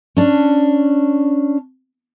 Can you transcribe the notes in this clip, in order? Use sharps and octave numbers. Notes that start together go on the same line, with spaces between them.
C#4 D4